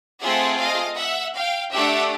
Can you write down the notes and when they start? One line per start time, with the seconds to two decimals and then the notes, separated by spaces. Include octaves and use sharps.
0.23 A3 C4 F4 G#4 E5 F#5
0.60 D#5 F5
0.97 E5 F#5
1.36 F5 G5
1.73 A3 D4 G4 E5 F#5